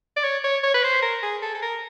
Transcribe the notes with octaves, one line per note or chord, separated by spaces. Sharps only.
D5
C#5
C#5
C#5
B4
C5
A#4
G#4
A4
A4
A#4